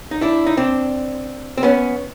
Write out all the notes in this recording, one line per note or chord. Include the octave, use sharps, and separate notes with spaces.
D#4
D4 E4
D#4
C4 D4
C4
B3 C#4